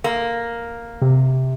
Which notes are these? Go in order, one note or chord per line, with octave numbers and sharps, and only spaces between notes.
A#3
C3